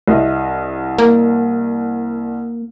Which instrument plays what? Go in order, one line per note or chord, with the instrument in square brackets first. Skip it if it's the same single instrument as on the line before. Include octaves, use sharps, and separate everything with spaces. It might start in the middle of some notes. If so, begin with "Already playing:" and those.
[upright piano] C2 D#5 E5
[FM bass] A#3